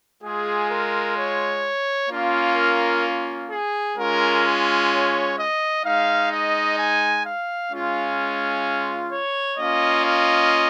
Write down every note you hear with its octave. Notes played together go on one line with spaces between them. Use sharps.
G#3 F4 G#4
A#4
C#5
A#3 C#4 F4
A#4
G#4
G#3 C#4 F4 A#4
C#5
D#5
G#3 D#4 F5
D#5
G#5
F5
G#3 C#4 F4
C#5
A#3 C#4 F4 D#5
D#5